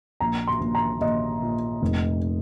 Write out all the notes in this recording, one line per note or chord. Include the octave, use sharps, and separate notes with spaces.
A#1 A#5
C6
A#1
A#5
A#1 D#5
A#2
F1